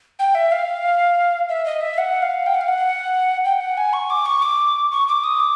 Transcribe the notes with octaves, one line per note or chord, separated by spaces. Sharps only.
G5
E5
F5
E5
D#5
E5
F#5
F5
G5
F#5
F5
F#5
G5
F#5
G#5
C#6
D6
C#6
D6
C#6
D6
D#6
D6